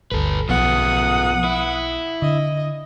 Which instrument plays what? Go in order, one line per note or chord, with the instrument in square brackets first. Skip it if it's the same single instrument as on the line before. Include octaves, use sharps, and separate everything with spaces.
[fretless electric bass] G1 D2 [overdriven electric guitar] A4 B4
[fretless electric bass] B1 [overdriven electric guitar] F3 B3 [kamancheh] F#5 D#6
[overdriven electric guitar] E4
[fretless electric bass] D3 [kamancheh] D#5